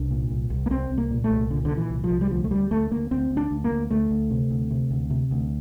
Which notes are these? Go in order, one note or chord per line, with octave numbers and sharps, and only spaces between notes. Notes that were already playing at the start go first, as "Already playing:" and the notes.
Already playing: C2 D4
A#2
C2
C2
A#3
C2 C4
C2
A#3
A#2
A3
C2
A#2 D3
D3
A#2
E3
C2
F3
C2
G3
D2 F3
A3
D2 G3
D2 A3
D2 A#3
D2 C4
D2
D4
D2
A#3
D2
D2 A3
D2
C3
D2
C3
D2
C3
D2